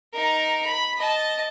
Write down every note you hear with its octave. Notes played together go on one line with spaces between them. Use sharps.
D#4 A#4
B5
D#5 A5